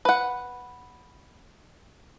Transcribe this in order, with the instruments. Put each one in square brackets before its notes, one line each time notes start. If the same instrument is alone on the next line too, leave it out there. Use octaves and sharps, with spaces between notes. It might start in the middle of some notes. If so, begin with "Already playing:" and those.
[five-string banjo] B4 F#5